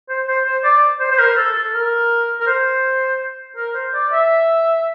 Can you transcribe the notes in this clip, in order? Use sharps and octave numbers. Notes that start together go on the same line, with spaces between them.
C5
C5
C5
D5
C5
C5
A#4
A4
A4
A#4
A#4
C5
A#4
C5
D5
E5